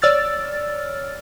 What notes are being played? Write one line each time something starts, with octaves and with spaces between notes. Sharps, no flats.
C#5 D5 E6 F6 A6